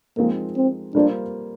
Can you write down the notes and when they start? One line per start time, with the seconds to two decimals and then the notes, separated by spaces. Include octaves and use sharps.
0.17 F3 G#3 A#3 C4 D#4 A#4
0.56 C4
0.95 G3 A#3 D4 F4 C5